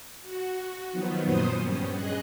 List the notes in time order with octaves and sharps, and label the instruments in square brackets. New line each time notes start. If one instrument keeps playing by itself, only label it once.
[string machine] F#4
D#3 F3 F#3 B3
F#2 A#2 F#3 B3 C5 D#6
G2 G3 C#4
G#4 D#5 F#6